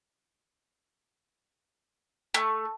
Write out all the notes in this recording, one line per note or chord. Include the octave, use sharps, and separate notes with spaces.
A3